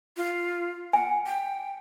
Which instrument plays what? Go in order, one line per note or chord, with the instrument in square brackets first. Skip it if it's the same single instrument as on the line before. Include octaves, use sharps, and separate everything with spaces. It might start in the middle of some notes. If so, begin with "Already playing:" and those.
[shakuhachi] F4
[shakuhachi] F#5 [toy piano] G#5
[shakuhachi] G5